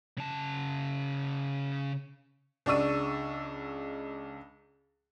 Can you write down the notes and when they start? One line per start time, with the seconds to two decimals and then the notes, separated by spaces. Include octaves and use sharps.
0.18 C#3 A5
2.66 C#2 D4 D5 C#6 E6 D#7